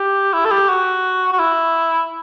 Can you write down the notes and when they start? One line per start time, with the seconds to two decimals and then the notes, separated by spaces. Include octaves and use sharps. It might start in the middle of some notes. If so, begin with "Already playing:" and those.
Already playing: G4
0.34 E4
0.45 A4
0.51 G4
0.69 F#4
1.33 F#4
1.39 E4